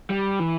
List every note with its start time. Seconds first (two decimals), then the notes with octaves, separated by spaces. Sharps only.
0.10 G3
0.39 E3